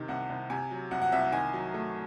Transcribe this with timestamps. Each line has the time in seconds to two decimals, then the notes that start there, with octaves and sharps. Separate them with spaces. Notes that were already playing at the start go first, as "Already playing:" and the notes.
Already playing: C3 D#3
0.08 C2 F#5
0.29 C2
0.50 C3 G#5
0.71 F#3
0.91 C2 F#5
1.02 F#5
1.12 C2 E5
1.22 F#5
1.32 D#3 G#5
1.53 F#3
1.74 A3